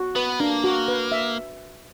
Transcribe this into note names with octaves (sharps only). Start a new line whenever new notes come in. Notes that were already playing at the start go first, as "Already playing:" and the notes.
Already playing: F#4
B3 B4
A#3 D4
F#4
B4
E5